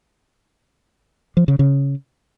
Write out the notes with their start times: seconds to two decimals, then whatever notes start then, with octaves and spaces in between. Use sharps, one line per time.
1.37 F3
1.48 C#3
1.59 C#3